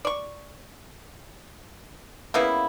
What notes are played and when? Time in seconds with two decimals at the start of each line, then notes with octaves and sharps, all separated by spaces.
0.05 D5 C#6
2.34 C#3 A#3 B3 E4